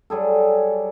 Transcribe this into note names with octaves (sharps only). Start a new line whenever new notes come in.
F#3 G3 G#4 A4